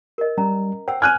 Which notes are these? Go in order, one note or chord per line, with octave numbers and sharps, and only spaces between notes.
A#4 D#5
G3 C#4 A#5
C5 F#5 G5 E6
G#5 D6 F6 F#6 G#6 D#7